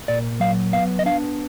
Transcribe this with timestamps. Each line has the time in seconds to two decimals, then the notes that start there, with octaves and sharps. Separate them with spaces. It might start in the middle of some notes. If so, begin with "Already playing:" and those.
0.08 A#2 D5
0.40 F#3 F5
0.72 B3 F5
0.99 D#5
1.06 D4 F5